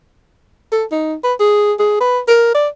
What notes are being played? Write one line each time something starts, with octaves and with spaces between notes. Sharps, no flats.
A4
D#4
B4
G#4
G#4
B4
A#4
D5